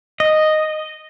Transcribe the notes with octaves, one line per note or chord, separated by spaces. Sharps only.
D#5